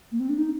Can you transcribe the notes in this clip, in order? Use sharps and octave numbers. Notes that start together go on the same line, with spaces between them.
A#3
C4
D4
D#4